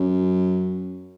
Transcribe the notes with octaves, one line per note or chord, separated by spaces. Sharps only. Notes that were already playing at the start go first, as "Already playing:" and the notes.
Already playing: F#2